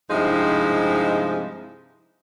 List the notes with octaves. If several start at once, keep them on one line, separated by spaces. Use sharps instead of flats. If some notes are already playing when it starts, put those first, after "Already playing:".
G2 C3 F3 G#3 D#4 E4